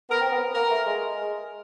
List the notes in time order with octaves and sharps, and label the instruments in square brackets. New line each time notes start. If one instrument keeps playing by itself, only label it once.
[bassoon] B3 [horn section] A#4
[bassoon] C4
B3
[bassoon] A#3 [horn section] A#4
[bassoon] A3
G#3